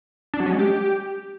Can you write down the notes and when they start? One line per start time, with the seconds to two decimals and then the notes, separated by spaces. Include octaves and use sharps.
0.34 D4
0.40 F#3
0.46 C#4
0.53 G#3
0.59 G4